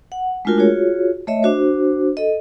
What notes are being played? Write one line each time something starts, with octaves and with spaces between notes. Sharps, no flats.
F#5
G#3 A3 D4 F4 F#4 A#4
F4 F#4 G#4 C#5
A3 C#5 D#5 E5
D4 F#4 C5
A4 D#5